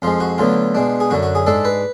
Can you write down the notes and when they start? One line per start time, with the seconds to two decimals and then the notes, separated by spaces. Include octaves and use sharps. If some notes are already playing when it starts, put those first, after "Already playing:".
0.02 F2 F3 G#3 F4
0.20 F#4
0.38 D2 D3 F#3 B3 F4
0.75 B2 G#3 D4
1.00 G#4
1.10 F#2 D3 F#3 F#4
1.23 F#4
1.35 G#4
1.47 G#2 G#3 D4 A4
1.65 B4